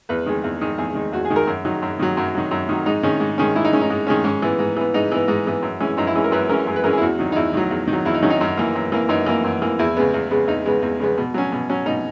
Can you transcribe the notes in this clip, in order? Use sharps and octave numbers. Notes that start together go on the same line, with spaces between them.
E2 B4
D#3 G#3
E2
D#3 G#3
E2 G#4
D#3 G#3
E2 F#4
G#4
D#3 G#3
A#4
F#2
D#3 F#3
F#2
D#3 F#3
F#2
D#3 F#3
F#2
D#3 F#3
G#2 D#4
D#3 G#3 C#4
G#2
D#3 G#3 C#4
G#2 E4
D#4
D#3 G#3 C#4
D#4
G#2
D#3 G#3 C#4
G#2 C#4
E3 B3
G#2
E3 B3
G#2 D#4
E3 B3
G#2
E3 B3
F#2
E3 G#3 C#4
F#2 D#4
E4
E3 G#3 C#4
A#4
F#2 B4
E3 G#3 C#4 A#4
F#2 G#4
B4
E3 G#3 C#4 A#4
G#4
E4
E2 F#4
D#3 F#3
D#4
E2 E4
D#3 F#3
E2
D#3
F#3
E2 E4
D#4
D#3 F#3 C#4
D#4
F#2
E3 A#3
F#2
E3 A#3
F#2 D#4
E3 A#3
F#2
E3 A#3
E2 E4
C#3 G#3 B3
E2
C#3 G#3 B3
E2 D#4
C#3 G#3 B3
E2
C#3 G#3 B3
B2
F#3 C#4
B2
F#3 C#4
B2 D#4